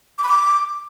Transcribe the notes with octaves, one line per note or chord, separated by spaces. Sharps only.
D6
B5
D6